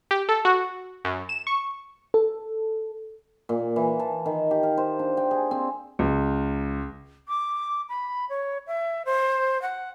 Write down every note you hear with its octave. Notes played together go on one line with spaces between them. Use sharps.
G4
A4
F#4
F#2
E7
C#6
A4
A#2
E3
A5
D#3
G4
F5
C5
D4
G5
G#4
C4
C#2
D6
B5
C#5
E5
C5
F#5